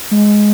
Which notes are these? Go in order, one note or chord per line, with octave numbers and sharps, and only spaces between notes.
G#3